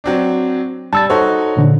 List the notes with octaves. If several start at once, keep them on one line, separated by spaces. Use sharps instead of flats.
F#3 C4 D4
G3 A5 E6 A6
D#4 F#4 A4 C5 C#5
A#2 D3